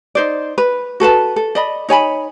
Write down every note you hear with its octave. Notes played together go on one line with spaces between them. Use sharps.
D#4 C5 D5
B4
F#4 A4 B4 A5
A4
D5 D#5 B5
D#4 C#5 G#5 B5